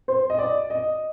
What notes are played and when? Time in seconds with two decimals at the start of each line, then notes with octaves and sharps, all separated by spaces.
0.08 C5
0.30 D#5
0.39 D5
0.70 D#5